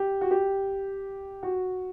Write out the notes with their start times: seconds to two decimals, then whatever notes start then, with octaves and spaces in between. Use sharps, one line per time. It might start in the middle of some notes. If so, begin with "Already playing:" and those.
Already playing: G4
0.21 F#4
0.31 G4
1.43 F#4